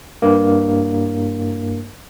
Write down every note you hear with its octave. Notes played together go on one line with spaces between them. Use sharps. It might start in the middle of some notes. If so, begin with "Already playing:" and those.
G2 A#3